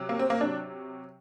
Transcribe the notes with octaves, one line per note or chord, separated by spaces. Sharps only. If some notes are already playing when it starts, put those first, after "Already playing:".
Already playing: C3 F#3
A#3
C4
A#3
C3 F#3 D4